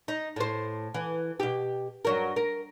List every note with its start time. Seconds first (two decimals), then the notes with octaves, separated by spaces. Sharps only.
0.08 D#4
0.36 A2 C5
0.94 E3
1.40 B2 G4
2.05 G2 F#3 A#4
2.36 A#4